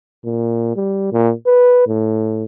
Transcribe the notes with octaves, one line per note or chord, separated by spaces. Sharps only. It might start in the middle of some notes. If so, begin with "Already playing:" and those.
A#2
G3
A#2
B4
A2